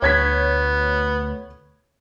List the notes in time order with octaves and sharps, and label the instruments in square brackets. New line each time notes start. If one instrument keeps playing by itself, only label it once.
[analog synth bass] D2 [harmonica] B3 [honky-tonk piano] C#5 G#6 B6